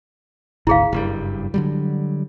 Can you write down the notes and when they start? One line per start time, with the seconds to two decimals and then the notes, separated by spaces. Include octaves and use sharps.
0.67 G#1 D2 E4 G#4 F5
0.93 F#1 G2 G3
1.54 D3 F#3 G3